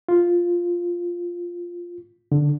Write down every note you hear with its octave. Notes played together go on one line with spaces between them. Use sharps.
F4
D3